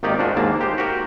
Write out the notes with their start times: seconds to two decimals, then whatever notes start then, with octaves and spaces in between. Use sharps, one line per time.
0.03 G#1 D#3 A#3 D#4 G4 D5
0.18 G#2 D4 F4 F#4
0.36 D#2 G#2 A#3 A5
0.61 G4 C5
0.78 F#4 G4 A#4